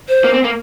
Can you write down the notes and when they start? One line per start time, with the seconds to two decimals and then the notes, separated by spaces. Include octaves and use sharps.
0.09 C5
0.24 A#3
0.33 C4
0.44 A#3